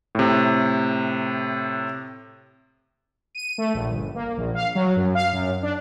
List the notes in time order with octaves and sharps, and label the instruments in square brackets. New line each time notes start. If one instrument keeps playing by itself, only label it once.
[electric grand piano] A2 C3
[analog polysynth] D#7
A3
A#1
G1
A#3
A#1
F5
F#3
F#2
F5
F#2
D4